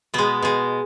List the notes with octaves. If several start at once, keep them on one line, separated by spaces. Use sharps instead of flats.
B2 G#3 B3
B2 G#3